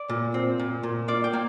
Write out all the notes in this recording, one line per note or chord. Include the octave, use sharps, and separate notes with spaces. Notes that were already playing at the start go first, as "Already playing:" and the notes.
Already playing: D5
A#2
C4
A#2
A#2
A#3 D5
G5
A#3